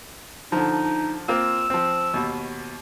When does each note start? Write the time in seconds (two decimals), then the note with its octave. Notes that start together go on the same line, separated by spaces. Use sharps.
0.52 D3 F3 D#4
1.28 A#3 C4 F4 E6
1.70 F3 C4
2.14 D#2 B2